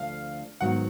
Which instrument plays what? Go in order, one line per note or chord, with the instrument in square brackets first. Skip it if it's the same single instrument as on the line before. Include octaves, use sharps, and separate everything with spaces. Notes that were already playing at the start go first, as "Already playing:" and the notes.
Already playing: [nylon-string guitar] D2 D3 F3 A3 [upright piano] F5
[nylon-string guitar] G#2 D#3 F#3 B3 [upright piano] F#5